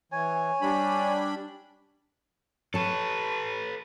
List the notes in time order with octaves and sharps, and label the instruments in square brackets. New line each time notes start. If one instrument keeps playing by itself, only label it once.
[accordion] E3 [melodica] C#5 G#5
[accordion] G3 D4 B5
[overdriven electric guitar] A4 B4 [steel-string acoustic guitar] C#5 A5